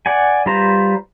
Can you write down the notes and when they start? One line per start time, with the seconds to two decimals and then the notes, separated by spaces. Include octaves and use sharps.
0.06 D5 F#5 G#5
0.46 G3 F4 B4 C5 A#5